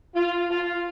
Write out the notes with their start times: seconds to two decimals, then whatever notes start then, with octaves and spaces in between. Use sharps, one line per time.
0.15 F4
0.50 F4